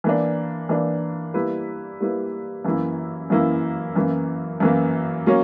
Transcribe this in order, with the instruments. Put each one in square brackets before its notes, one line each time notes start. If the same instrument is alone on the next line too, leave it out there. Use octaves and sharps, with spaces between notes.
[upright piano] E3 A#3 D4
E3 A#3 D4
G3 A#3 E4 B4
G3 A#3 E4 B4
F#2 E3 A#3 E4
F#2 E3 A#3 E4
F#2 E3 A#3
F#2 E3 A#3
F#3 A#3 C#4